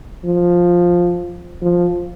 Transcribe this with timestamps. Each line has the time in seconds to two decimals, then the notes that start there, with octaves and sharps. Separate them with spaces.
0.25 F3
1.62 F3